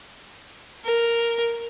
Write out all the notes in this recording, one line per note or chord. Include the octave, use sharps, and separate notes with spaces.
A#4